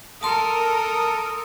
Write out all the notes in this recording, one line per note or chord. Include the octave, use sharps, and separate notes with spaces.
A4 A#4 A5 C6 D#6